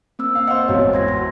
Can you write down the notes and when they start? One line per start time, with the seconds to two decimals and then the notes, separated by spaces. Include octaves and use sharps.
0.19 A#3 C4 E6
0.35 F5
0.48 C5 D#5 F5 F#5
0.68 G#1 E2 E4 F#4 C#5
0.93 C6 G#6 A#6
1.08 C6